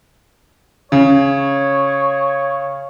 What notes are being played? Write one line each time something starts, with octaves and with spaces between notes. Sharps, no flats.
C#3 C#5